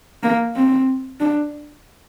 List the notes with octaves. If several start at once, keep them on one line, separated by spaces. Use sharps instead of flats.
A#3
C4
D4